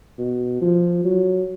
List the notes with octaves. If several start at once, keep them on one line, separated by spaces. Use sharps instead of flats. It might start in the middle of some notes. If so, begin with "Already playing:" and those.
B2
F3
F#3